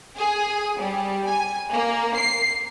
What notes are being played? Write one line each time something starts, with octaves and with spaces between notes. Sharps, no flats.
G#4
G3
G#5
A#3
C7